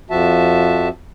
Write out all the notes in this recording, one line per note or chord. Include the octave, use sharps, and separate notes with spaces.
F2 F3 F#4 E5 A5